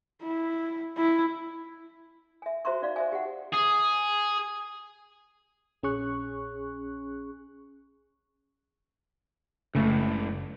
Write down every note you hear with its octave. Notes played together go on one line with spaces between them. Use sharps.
E4
E4
E5 G#5
F#4 C5 E5 A#5 C6 C#6
D#4 D5 F5
C5 E5 G#5
G4 F#5
G#4
A#1 C#4 G#4 C#6 F#6
F#1 C#2 A2 C#3 A3